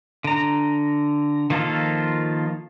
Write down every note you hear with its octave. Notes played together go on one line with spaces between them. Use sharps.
D3 A#5
D#3 F3 A#3 F4 A4